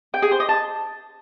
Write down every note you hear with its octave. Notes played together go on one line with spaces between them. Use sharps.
G5
G#4
C5
D#5
A5